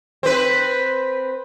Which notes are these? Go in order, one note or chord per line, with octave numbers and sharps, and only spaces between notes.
C4 B4